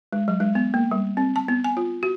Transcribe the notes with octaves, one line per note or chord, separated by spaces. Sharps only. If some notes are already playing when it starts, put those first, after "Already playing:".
G#3
F#3
G#3
B3
A#3
G3
C4
A5
B3
G#5
F4
F#4